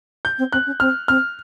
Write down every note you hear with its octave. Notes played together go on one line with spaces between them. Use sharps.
G6
C4
C4 F#6
C#4
C4 F6
C4 F6